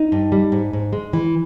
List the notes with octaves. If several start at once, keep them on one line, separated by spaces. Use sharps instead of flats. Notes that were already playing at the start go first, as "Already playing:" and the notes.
Already playing: D#4
G2
G3
G#2
G#2
G#3
E3